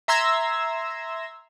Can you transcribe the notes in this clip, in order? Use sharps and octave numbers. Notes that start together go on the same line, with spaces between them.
E5 A#5 C6 E6 G#6 A#6